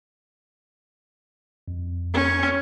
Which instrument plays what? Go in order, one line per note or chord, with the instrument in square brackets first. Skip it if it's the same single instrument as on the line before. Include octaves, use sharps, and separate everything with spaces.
[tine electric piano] F2
[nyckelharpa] C#4